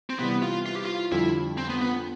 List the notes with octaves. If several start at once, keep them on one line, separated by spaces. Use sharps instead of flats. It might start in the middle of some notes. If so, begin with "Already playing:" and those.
C4
C3 E3 G3 B3
F4
F4
G4
F4
F2 D3 G3 D4 E4 F4
C4
B3
B3